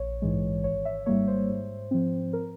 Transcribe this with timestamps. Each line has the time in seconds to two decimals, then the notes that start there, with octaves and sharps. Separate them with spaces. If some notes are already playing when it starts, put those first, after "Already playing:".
Already playing: A#1 C#5
0.22 G#2 E3 G#3
0.64 G#1 C#5
0.85 E5
1.06 G#2 G3 A#3 C#5
1.28 C5
1.49 G#2
1.91 F3 C4
2.33 A#4